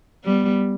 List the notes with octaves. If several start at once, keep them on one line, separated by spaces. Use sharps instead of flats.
G3 B3